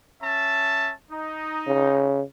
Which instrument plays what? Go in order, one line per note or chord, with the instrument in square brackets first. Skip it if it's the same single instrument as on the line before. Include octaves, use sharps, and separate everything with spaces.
[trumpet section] C#4 E5 A5
D#4
[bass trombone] C#3